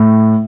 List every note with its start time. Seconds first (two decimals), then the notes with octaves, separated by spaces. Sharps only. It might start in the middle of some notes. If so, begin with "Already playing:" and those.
Already playing: A2